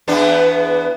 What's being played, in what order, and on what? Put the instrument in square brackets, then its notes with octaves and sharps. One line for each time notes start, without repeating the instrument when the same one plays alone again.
[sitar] E2 B3 D4